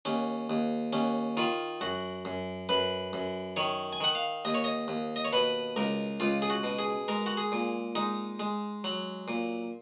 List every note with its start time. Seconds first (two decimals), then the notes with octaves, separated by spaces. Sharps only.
0.05 D#2 C#4
0.50 D#2
0.93 D#2 C#4
1.37 D#3 F4
1.81 F#2 F#4
2.25 F#2
2.69 F#2 B4
3.13 F#2
3.56 D#3 C#5
3.93 G#5
4.01 D#3 F#5
4.15 F5
4.45 D#2 D#5
4.54 C#5
4.64 D#5
4.88 D#2
5.16 D#5
5.25 C#5
5.33 B2 B4
5.76 C#2 A#4
6.20 C#2 F4
6.42 G#4
6.50 F#4
6.63 B2
6.79 G#4
7.08 G#3 A#4
7.26 F#4
7.37 G#4
7.52 A#2
7.95 G#3 D#4
8.40 G#3
8.84 F#3
9.28 A#2